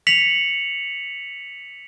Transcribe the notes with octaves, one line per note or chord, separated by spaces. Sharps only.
B6 C#7 F7 F#7